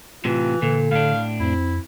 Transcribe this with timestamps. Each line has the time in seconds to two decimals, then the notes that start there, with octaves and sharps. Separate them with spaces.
0.25 A2 C3 E3 F4
0.62 A#2 D3 A4
0.91 A2 D4 F5
1.40 F2 C4 E4